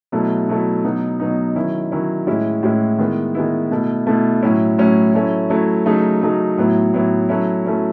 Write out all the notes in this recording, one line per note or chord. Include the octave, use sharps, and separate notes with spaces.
B2 F#3 A3 E4
B2 F#3 A3 E4
B2 F#3 B3 D#4
B2 F#3 B3 D#4
D#3 F#3 C#4 E4
D#3 F#3 C#4 E4
A2 G#3 C#4 E4
A2 G#3 C#4 E4
D#3 G#3 B3 E4
D#3 G#3 B3 E4
B2 A3 E4
B2 A3 E4
A2 F#3 C#4 E4
A2 F#3 C#4 E4
F#3 A3 C#4 E4
F#3 A3 C#4 E4
C#3 F#3 A3 D#4
C#3 F#3 A3 D#4
A2 F#3 B3 E4
A2 F#3 B3 E4
F#3 A3 C#4 E4
F#3 A3 C#4 E4